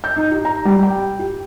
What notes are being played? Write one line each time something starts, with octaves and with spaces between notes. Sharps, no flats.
G6
D#4
G4
A#5
G3
G5
G4